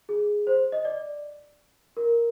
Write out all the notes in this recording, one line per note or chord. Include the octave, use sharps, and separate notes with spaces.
G#4
C5
D#5
D5
A#4